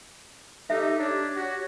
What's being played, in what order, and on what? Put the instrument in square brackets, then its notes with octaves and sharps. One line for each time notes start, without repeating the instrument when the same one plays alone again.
[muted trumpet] D#4 [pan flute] G4 [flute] A4 [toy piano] E5
[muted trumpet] D4 [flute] C#5
[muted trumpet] F#4